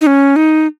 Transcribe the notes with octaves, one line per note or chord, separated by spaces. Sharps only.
D#4
C#4
D#4